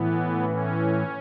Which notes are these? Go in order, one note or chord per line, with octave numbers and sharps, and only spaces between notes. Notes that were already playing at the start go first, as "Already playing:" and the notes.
Already playing: A2 E3 B3
C#4